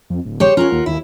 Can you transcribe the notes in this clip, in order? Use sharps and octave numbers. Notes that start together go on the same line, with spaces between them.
F2
D1
G4 C5 C#5
C#4 F4 A#4 F#5
D#2
D#2 E4